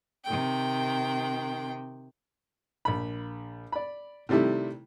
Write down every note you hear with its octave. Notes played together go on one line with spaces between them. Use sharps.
C3 D#3 G5
A#1 B5
D5 B5
C3 D#3 G3 A3 E4